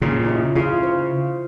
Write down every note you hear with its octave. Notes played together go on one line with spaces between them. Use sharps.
A#2 C#3
E4 D#5
C#3 F4 F5
C5